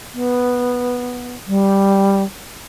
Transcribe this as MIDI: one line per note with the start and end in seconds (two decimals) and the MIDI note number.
0.13 1.35 59
1.47 2.22 55